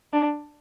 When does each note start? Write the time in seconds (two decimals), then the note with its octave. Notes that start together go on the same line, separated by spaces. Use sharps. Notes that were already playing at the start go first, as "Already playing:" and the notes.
0.13 D4